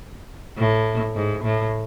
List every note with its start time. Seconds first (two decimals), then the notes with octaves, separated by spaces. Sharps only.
0.58 A2
1.16 G#2
1.44 A2